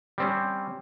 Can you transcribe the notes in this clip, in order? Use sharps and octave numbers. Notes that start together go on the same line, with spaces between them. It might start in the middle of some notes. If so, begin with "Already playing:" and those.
G3 C4 C#4